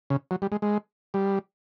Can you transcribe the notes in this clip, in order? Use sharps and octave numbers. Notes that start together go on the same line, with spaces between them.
C#3
F#3
G3
G#3
G#3
G3